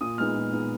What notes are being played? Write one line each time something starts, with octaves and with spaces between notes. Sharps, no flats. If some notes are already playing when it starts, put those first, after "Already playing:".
A#2 D#6
G#3 B3 D#4 F6
A#2
G#3 B3 D#4